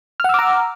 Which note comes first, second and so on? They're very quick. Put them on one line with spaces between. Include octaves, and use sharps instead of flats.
F6 F#5 E6 D6 A#5